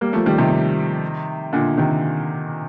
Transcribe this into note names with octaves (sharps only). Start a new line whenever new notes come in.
G3 A#3
F3 A3
D#3 G3
C3 D#3
A#2 D3
C3 D#3